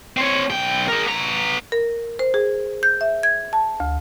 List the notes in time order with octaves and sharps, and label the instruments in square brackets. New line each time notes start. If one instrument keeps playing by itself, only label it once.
[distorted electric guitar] C4 C#5
B1 G5
G#4 A#4
B3 A#5
[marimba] A#4
C5
G#4
G6
E5
G#6
A5
D2